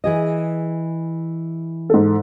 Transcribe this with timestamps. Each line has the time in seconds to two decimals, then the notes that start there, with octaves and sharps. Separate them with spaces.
0.04 E3 G#4 D#5
1.90 G#2 A4